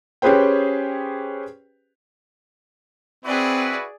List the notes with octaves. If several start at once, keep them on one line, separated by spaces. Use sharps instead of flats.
C#4 G4 G#4 B4 C5 G5
C4 E4 F#4 G#4 B4 D5